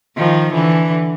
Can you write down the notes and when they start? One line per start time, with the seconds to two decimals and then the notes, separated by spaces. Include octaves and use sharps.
0.16 D#3 F3
0.53 D3 E3